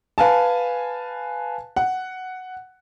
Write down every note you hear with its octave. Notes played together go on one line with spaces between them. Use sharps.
B4 F5 G#5 A5
F#5